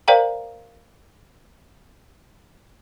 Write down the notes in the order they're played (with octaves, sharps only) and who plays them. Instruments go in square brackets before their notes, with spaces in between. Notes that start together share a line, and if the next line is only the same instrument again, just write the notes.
[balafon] A#4 C5 D5 F5 G5 A#5